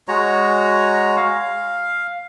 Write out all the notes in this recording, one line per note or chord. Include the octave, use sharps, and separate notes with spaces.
G#3 F#4 C#5 A#5
F5